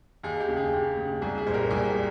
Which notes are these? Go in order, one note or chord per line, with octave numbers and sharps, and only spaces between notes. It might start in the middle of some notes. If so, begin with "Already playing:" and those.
D#2 G#4
G4
C#3
G#4
D#2 G4
C#3
C2 G#4
G#4
A#2 C5
G4 A#4
C2 G#4